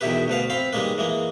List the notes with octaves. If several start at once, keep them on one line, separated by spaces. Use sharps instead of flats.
E2 B2 D#3 E4 G4 B4
D2 B2 B4 F5
C4 F5 B5
D#3 G3 G#3 A#3 B4
E3 G#3 A#3